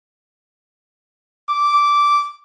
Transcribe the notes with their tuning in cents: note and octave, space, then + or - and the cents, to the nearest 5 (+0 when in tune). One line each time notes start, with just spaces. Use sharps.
D6 -10